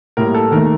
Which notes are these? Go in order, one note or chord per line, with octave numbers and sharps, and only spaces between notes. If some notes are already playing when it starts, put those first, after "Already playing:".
A2 G3 A#3 A#4
A4
D#2 D#3 A3 A#4